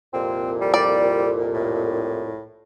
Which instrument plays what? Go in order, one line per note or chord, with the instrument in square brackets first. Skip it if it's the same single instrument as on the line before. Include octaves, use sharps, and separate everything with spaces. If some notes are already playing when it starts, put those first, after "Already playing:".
[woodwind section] C2 F2 A#2 [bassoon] C4
[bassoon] G3
[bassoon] G3 [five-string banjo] D5
[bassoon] A2